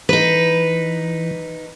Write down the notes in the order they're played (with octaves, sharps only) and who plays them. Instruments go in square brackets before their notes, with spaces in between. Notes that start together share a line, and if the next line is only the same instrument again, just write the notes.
[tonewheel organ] E3 [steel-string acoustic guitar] D#4 B4